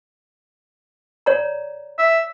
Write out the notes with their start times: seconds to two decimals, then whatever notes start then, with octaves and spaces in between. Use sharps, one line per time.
1.26 C#5 D5 A#5
1.98 E5